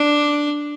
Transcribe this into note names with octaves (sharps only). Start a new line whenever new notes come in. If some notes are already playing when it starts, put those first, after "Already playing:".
Already playing: D4